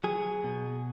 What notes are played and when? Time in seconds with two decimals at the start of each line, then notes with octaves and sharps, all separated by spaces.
0.04 F#3 G#4
0.44 B2